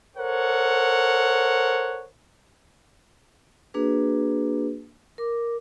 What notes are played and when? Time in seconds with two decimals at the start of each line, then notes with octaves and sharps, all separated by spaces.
0.16 A4 A#4 C5 C#5 F#5
3.74 A#3 D4 F#4 G#4 B4
5.18 A#4 D6